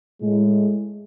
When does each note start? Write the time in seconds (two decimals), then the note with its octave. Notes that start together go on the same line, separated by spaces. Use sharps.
0.22 A2 G#3